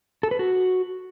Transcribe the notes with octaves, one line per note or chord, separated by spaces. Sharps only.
A4
B4
F#4